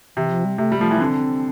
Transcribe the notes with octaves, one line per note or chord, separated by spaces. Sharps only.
C3 E3
F3
G3
C3 A3
G3
F3 A3
E3
D3 C4